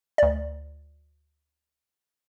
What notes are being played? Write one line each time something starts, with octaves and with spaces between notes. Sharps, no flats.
D2 D5